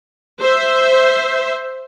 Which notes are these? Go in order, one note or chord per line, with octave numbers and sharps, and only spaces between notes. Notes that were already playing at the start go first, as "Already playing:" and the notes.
C5 E5